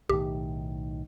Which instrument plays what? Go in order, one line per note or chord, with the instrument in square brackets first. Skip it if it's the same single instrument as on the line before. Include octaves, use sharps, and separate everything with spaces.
[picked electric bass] B1 A2 D#3 [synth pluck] G4